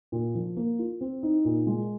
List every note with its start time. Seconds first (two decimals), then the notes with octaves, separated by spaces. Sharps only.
0.12 A#2
0.35 F3
0.57 A#3
0.79 F4
1.01 C4
1.23 D#4
1.45 A#2
1.67 G#3